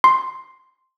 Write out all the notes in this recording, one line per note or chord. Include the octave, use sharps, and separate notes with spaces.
C6